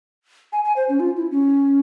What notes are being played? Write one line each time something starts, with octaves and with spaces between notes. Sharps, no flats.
G#5
G#5
C5
C#4
F4
E4
C#4